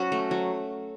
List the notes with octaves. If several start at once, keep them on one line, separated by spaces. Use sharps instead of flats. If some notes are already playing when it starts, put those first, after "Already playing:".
Already playing: F#3 C#4 F#4
A3
F#3